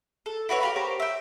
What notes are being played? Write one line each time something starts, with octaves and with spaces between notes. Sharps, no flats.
A4
E4 F#4 B4 C#5
G4 F5 B5
G4 A#4 C5 C#5
E5 G5